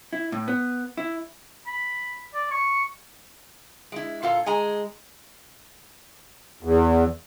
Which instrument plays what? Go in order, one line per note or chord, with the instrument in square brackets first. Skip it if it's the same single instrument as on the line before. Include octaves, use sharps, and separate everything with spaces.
[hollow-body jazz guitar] E4
A2
B3
E4
[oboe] B5
D5
C#6
[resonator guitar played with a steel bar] G#3 E4
[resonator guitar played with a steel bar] A#2 A4 F5 [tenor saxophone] F4
[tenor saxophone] G#3 [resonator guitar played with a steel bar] G#5 A#5
[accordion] E2